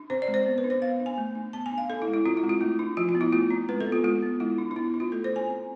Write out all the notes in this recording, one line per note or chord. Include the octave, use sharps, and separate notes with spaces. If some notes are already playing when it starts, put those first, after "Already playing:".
Already playing: D4
C4 C5
D5
G#3
C5
B3
B4
D4
C5
B3 F5
D4
G#5
A3
D4
B3 A5
G#5
D4
F5
D4 A4
E4
G#3
E4
C4 F4
E4
G#3
F4
A3 E4
D4
F3 F4
F4
B3
E4
A3 F4
C4
G#3 B4
A4
B3
F4
G#3 F4
B3
G#3 E4
D4
D4
B3 E4
D4
F4
A3 A4
C5
D4
G#5
C4